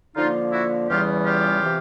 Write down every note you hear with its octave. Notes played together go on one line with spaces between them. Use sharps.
D3 F3 A#3 D#4 F4
E4 F#4
E2 C#3 E3 G3 B3 F4 G4
F4 G4
C3 E3